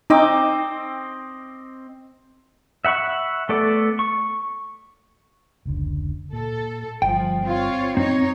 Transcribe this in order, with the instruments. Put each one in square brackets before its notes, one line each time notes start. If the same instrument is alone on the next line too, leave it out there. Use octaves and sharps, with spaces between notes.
[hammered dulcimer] C4 D#5 D6 [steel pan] D#4
[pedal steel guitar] E5 F#5 B5 C#6
A3 B3 A4 D5
C#6
[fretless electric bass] F1 C#2 D3
[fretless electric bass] A#2 [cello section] A4
[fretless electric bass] G1 G3 [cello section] F3 [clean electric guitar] G5
[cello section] C4 F4 C#5
[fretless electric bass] F#2 [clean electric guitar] C4 [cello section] D#4 C#5